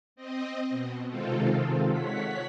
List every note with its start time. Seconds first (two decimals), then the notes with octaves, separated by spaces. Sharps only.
0.16 C4 D#5
0.70 B2
1.10 C3 D#3 G#3 C4 F4 A4
1.90 C#5 F#5 B6